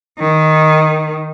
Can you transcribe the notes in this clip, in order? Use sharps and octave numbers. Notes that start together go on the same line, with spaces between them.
D#3